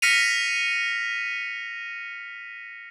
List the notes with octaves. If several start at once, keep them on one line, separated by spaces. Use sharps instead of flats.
F6 A#6 B6 C#7 D#7 F7